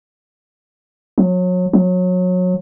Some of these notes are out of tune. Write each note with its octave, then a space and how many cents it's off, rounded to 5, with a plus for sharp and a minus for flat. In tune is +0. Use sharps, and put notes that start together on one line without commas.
F#3 -30
F#3 -25